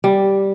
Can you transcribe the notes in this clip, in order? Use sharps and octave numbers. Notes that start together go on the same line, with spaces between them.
G3